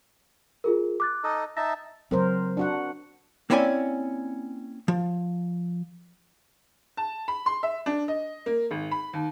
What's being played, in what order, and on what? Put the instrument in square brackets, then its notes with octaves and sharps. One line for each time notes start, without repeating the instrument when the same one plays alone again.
[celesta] F4 G#4 A#4
D6 F#6 A6
[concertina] D#4 A4 D#5
[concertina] D#4 E5 A5 [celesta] A#6
[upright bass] C#3 F#3 [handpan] C4 A#4 C5
[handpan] D4 F#4 F#5
[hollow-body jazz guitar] A#3 C4 C#4 E4 D5 G#5
F3
[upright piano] A5
B5
C6
E5
D4
D#5
A#3
G#1
B5
D#2